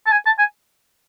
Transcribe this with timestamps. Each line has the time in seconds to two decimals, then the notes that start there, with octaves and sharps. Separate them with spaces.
0.06 A5
0.12 G#5
0.26 A5
0.39 G#5